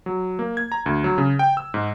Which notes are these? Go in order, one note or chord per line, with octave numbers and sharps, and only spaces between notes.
F#3
A#3
G#6
A#5
D2
F#3
C#3
G5
E6
G#2